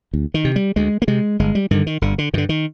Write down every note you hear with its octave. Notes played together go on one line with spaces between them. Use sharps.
D2
D#3
C3
G3
D2 G#3
A#3
C3 G#3
G1 G#3
G3
G2 D3 D#3
D#3
G1 D3
D3
G2 D3 D#3
D#3